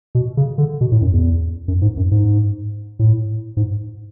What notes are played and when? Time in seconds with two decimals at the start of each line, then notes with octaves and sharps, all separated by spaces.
0.15 B2
0.37 C#3
0.58 D3
0.81 B2
0.92 A2
1.02 F#2
1.13 E2
1.68 F#2
1.82 G#2
1.97 F#2
2.11 G#2
2.99 A2
3.57 G#2